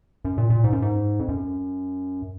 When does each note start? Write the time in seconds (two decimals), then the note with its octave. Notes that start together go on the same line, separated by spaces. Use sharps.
0.25 F#2
0.38 A#2
0.50 A#2
0.64 G#2
0.72 F#2
0.82 G#2
1.20 F2
1.29 F#2